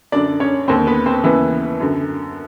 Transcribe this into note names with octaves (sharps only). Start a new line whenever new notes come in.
F#2 D3 D4 D5
C#4 C#5
D#2 D3 C4 C5
B3 B4
C4 C5
D#2 C#3 E3 B3 B4
F#2 D3